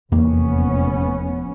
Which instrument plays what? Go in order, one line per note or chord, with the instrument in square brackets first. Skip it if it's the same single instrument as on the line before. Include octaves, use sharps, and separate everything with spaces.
[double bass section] F1 B3 C#4 [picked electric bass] E2 A#3